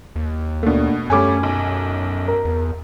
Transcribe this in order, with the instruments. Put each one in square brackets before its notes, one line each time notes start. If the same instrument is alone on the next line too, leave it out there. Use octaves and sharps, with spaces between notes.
[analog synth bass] D#2
[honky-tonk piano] B2 A3 [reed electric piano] A#3 D4
[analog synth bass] F#2 [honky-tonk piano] G3 A3 C#4 [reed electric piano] G#5 D6
[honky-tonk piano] B1
[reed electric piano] A#4
[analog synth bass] E2